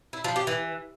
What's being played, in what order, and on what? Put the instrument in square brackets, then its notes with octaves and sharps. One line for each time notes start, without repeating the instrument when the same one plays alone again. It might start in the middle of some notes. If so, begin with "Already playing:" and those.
[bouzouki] E4
F3
G4
E3